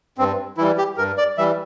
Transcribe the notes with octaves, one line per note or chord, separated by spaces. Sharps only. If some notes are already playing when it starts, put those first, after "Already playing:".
G2 C4
E3 G3 E4
G4
G2 A#4
D5
E3 G3 E5